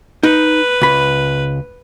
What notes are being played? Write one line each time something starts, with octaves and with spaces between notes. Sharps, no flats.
D#4 B4
C#2 B5